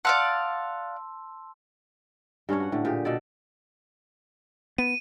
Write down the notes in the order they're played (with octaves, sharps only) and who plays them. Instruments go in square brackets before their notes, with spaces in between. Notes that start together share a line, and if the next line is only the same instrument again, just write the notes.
[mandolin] D5 F5 F#5 [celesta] A5 C6 E6
[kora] G2 C#4 D4 C#5
F#4 F#5
A2 D3
A#2 G4 G#4
B2 A4 D5
[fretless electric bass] B3 [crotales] D#7